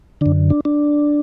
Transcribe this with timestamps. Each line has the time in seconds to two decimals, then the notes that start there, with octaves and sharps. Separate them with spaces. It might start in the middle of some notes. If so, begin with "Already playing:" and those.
0.21 F#2 D3 D4
0.50 D4
0.65 D4